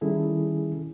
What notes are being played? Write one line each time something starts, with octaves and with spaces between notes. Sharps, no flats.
D#3 G3 C#4 E4 G#4 A4